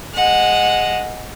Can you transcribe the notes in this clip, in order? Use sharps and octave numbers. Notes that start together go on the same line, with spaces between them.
G#3 F#5